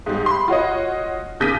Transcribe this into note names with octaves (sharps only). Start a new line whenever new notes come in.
G#2 G3
B5 C6
F4 F#4 C#5 D#5
D#2 C#3 G6 A#6 B6 D#7